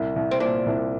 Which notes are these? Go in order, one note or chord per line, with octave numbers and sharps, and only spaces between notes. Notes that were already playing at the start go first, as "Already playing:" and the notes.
Already playing: C2
C2
C4
A#2 D4
C2